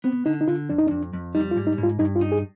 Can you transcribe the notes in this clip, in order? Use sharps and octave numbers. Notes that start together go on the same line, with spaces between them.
B3 C4
D3 D#4
D#4
D3 F4
F2 D4
D#4
F2 D4
F2
G3 D#4
F4
G#2
D#4
G#2
F4
G2 D#4
F4
D#4
G#4